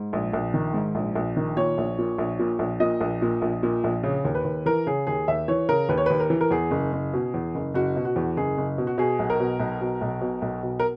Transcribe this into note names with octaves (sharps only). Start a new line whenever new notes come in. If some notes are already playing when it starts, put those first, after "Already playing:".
Already playing: G#2
A#1
A#1
D#3
G#2
A#1
A#1
D#3
A#2 C#5
A#1
A#2
A#1
A#2
A#1
A#2 D#5
A#1
A#2
A#1
A#2
A#1
C#3
D#2
B4
D#2
E3 A#4
C#3 G#4
D#2 G#4
D#2 E5
E3 C#5
C#3 A#4
D#2 B4
C#5
D#2 B4
A#4
E3
A#4
E2 G#4
F#1
F#1
B2
E2
F#1
F#1 F#4
B2
F#4
E2
F#1 G#4
F#1
B2
F#4
B2 G#4
B1
A#4
B2
B1
B2
B1
B2
B1
B2
A#4